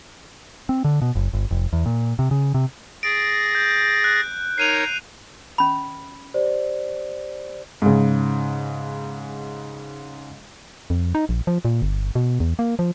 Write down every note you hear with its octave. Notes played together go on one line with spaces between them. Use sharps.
C4
D3
B2
F#1
G1
F1
E2
A#2
C3
C#3
C3
G#4 A6 A#6 D7
G6
F#6
D#4 A#4 C#5 C7 D#7 F7
C#4 B5
G4 C5 D5
G#2 C#3
F2
D#4
A#1
F3
A#2
G1
B2
E2
A#3
F3